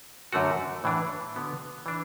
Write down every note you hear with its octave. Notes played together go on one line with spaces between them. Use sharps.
F#2 D3 A3 F#4
A2 E3 D4
D3 B3 F#4
E3 D4